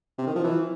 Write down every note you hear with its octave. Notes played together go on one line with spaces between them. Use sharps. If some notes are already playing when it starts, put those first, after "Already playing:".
C3
D#3
F3
E3